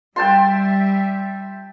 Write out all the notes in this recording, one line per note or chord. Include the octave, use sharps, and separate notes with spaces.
G3 E5 G5 A5 C6